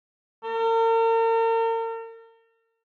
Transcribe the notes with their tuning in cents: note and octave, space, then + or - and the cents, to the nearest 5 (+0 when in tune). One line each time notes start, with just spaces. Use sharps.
A#4 -40